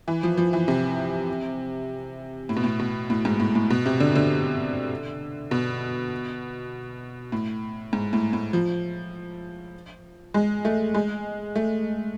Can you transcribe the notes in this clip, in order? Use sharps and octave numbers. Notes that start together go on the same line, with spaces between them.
E3
F3
F3
E3
C3
A2
B2
A2
B2
A2
G#2
A2
A2
B2
C3
D3
D3
B2
A2
G#2
A2
A2
F3
G#3
A3
G#3
A3